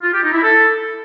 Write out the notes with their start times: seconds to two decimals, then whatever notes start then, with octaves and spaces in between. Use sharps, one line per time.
0.02 F4
0.13 G4
0.23 D#4
0.33 E4
0.44 A4